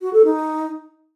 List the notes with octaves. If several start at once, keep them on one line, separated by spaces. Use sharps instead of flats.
F#4
A4
D#4